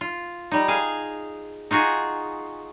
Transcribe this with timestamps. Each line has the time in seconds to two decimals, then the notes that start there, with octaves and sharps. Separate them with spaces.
0.01 F4
0.51 G3 D#4
0.68 G#4 F5 G#5
1.71 D#4 F4 F#4 G#4